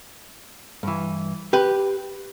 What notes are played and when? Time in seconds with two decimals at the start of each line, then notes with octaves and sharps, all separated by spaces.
0.83 G2 E3
1.53 G4 B4